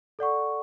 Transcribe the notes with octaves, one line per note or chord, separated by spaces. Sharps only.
A4 D5 F#5 C#6